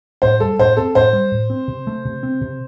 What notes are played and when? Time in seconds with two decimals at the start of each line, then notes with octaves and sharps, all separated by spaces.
0.22 A2 C5
0.40 G3 A4
0.59 A2 C5
0.77 C4 A4
0.95 A2 C5
1.13 G3
1.32 A2
1.50 C4
1.68 C3
1.87 A3
2.05 C3
2.23 C4
2.41 C3